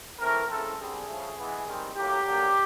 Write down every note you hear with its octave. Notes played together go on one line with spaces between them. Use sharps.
E3 A3 C4 A#4
C#3 E3 A3 C4 A4
D3 G3 C4 G#4
C#3 F3 A3
E3 G#3 B3
D#3 G3 C4
A2 F#3 A#3 G4
D3 F#3 A#3